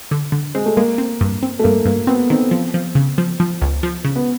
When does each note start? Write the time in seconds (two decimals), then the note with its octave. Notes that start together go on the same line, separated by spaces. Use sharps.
0.11 D3
0.32 D3
0.55 G#3 C4
0.66 A3
0.77 G#3 A#3
0.98 C4
1.21 G2
1.43 C4
1.59 A3
1.64 G2 A#3
1.85 G2 A#3
2.07 B3 C4
2.30 D#3 C4
2.51 F3
2.74 F3
2.95 C#3
3.18 F3
3.40 F3
3.62 C#2
3.83 F3
4.05 C#3
4.16 B3